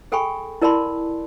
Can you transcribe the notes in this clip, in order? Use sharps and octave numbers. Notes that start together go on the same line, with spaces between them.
G#4 A4 G5 G#5 B5 C#6
E4 A#4 D5 A5 B5 C6